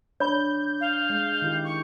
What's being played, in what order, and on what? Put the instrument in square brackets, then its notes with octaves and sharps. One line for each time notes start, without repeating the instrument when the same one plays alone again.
[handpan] D4 [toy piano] C#5 B5 [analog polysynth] G6
[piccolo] F5
[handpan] G#3
D#3 E4 G4
[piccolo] C#6